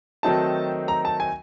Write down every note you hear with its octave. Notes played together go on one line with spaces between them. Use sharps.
D#3 F#3 A3 C4 D#4 A5
A#5
A5
G#5